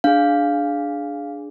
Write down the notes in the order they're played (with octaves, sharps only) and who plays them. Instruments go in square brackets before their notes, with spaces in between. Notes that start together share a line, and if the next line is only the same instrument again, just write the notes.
[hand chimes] D4 G#4 F5